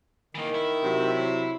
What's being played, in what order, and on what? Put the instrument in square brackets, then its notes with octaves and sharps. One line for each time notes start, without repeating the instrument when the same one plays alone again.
[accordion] D#3 [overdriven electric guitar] E3 A#3
[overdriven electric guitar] E4
[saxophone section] C3 F#3